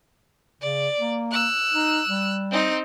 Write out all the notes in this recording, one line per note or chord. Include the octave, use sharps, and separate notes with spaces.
C#3 D5
A#3
E6 F#6
D#4
G3
C4 D#4